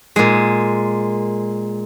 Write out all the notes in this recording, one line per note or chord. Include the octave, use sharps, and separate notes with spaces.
A#2 G#3